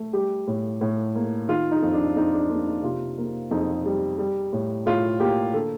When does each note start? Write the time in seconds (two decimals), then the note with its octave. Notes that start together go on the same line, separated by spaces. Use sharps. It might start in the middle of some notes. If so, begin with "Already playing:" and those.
Already playing: A3
0.13 G3 G4
0.47 A2
0.81 A2
1.15 A#3
1.48 D#3 F4
1.71 D#4
1.82 F2
1.94 D4
2.16 F2 D#4
2.33 D4
2.50 A#3 D4
2.66 D#4
2.83 C3 F4
3.18 A#3
3.51 F2 D#4
3.86 G3
4.18 G3
4.53 A2
4.86 A2 F4
5.20 A#3 G4
5.54 D3 A4